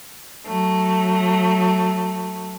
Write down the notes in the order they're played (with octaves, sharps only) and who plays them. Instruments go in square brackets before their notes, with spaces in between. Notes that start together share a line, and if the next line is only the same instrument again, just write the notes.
[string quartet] F#3 A3